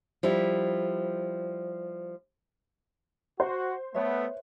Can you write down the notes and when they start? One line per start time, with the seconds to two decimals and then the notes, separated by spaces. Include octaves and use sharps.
0.23 F3 G3 E4
3.40 F#4 C5
3.95 A3 B3 B4 C#5 E5